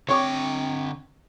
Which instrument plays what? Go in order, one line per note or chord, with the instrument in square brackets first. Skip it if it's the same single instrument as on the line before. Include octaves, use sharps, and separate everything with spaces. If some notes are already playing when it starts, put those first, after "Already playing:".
[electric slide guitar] D3 G5 [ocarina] C4 [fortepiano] C#5 C#6 D6